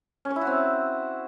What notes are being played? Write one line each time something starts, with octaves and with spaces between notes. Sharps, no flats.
C#4
C#5
E4
F#4
C4